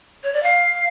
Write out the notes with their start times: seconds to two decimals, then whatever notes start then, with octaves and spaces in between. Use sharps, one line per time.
0.24 C#5
0.33 D5
0.43 F5